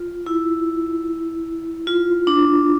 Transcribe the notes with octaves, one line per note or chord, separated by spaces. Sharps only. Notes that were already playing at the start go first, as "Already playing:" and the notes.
Already playing: F4
E4
F4
D4